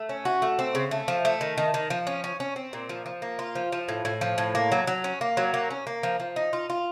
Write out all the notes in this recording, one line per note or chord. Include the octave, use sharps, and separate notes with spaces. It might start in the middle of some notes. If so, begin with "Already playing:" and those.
Already playing: A3
C#4
F#4
A3
C4
C#3
A3
F3
A3
D#3
D#3
D#3
F3
C#4
C#4
C#4
C4
A#2
F3
F3
A#3
F4
F3
F3
A2
A2
F3
A2
A#3
F#3
F#3
C#4
A#3
F#3
A#3
C#4
A#3
F3
F3
D#4
F4
F4